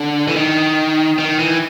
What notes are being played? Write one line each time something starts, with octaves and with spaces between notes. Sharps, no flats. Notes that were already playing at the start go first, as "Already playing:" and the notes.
Already playing: D3
E3
D#3
D#3
E3